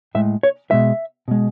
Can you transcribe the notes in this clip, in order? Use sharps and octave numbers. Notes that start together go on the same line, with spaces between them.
A2 G#3 E5
C#5
B2 G#3 E5
B2 G#3